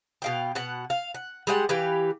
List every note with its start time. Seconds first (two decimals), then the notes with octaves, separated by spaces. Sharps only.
0.22 B2 F5 G5
0.55 B2 F#5
0.90 F5
1.15 F#5
1.47 G3 G#3 F#5
1.69 E3 G4 B4 F5